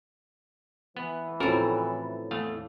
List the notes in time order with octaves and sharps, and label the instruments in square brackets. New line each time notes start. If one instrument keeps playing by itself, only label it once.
[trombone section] E3 [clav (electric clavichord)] B3
[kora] A2 A4 [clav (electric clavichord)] F3 F#4 A#4 [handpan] C4 C#4
[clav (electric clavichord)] E2 A3 F5